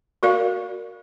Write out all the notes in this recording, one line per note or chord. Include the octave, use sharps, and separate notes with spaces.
F#4 A#4 D5 F5